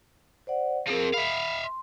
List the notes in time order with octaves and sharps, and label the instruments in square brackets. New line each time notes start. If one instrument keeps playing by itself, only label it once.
[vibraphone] C5 D5 F#5
[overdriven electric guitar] F3 C4 [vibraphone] G#4 A#4
[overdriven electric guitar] E5 F5 [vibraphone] B5
[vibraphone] C6